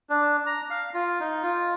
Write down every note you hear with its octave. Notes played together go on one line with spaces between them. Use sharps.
D4
A#5
F5
F4
D#4
F4